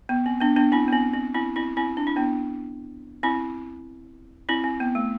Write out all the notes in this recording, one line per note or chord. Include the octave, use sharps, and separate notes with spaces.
B3
C4
B3 D4
B3 D4
C4 E4
B3
C4
C4
C4 E4
C4 E4
C4 E4
D4
E4
B3 D4
C4 E4
C4 E4
C4
B3
A3